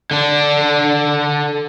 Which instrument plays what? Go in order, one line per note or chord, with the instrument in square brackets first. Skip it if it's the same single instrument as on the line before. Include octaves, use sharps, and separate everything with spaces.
[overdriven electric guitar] D3 D4